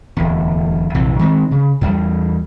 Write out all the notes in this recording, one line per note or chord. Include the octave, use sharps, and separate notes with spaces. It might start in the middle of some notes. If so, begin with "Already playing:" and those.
D1 E2
A#1 F2 C3 E3
D#3 G#3 C4
C#3
E2 G3